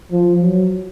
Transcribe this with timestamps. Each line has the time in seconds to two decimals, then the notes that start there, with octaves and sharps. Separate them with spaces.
0.11 F3
0.41 F#3